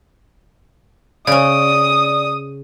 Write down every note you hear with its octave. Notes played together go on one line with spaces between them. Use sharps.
C#3 C#4 D5 D#6